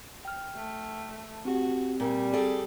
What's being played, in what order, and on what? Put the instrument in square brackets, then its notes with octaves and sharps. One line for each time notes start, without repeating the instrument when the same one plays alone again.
[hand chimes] G5 F6
[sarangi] A3
[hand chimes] C4 G4 [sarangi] F#4
[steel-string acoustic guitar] A#2 [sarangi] G3 [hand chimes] C4
[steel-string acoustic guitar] G#4 A4 D5